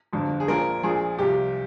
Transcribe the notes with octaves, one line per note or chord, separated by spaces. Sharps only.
G1 F2 D3 F3
G#4
A#1 A#2 F3 A#4
A#1 A#2 F3 G#4
C2 C3 F3 G4